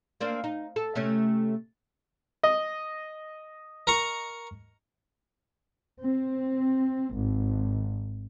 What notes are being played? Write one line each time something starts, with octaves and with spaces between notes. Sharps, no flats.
A#3 C4 D4
D#4
A4
C3 A3 C#4
D#5
A#4 A#5 C#6
C4
G#1